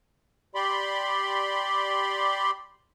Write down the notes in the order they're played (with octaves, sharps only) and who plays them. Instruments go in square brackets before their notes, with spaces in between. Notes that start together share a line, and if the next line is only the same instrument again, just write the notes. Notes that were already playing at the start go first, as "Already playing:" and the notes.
[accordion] G4 D5 B5 C6